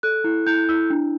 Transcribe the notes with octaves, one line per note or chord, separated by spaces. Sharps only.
A4 F#6
E4
E4 G6
E4 E6
D4